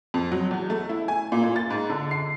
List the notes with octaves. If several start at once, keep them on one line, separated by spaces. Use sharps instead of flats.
F2
F#3
E2
A3
E4
G#5
A#2
A#2
A6
G#2
D3
C7